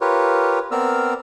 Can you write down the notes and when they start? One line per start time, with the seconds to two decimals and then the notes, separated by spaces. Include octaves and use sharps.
0.01 F4 G4 A#4 B4 C#5
0.71 B3 C4 A#4 D5 E6 F6